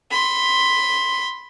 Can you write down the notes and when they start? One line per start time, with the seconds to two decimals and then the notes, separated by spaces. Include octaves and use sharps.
0.11 B5 C6